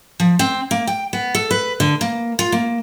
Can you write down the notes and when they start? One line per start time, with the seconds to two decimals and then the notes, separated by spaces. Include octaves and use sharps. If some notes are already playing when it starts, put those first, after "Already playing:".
0.20 F3
0.39 C4
0.71 A#3
0.87 G5
1.13 B3
1.35 A4
1.51 B4
1.80 D3
2.01 A#3
2.39 F4
2.52 A#3